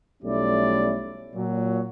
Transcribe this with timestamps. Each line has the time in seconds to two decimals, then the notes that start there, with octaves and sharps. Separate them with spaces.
0.23 B1 G3 A3 C#4 E4 D5
1.34 A#2 F#3